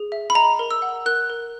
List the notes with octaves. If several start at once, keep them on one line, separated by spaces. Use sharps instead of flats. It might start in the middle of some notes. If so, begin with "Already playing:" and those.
Already playing: G#4
E5
B5
D#5 A#5
A#4
E6
F#5
A#4 F#6
A#4